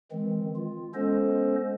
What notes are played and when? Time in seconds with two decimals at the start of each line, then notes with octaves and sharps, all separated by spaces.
0.12 D#3 E3 G#3 C4
0.56 F4
0.95 G#3 B3 C#4 A4 C5 D#5